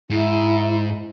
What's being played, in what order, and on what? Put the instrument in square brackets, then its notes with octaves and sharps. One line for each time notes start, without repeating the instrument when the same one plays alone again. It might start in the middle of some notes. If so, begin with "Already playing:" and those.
[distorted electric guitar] G#2 [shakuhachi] E4